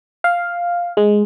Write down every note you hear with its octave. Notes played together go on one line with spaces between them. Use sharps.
F5
G#3